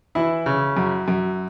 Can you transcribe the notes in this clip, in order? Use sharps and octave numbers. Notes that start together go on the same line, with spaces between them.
E3 E4
C#3
F#2
F#2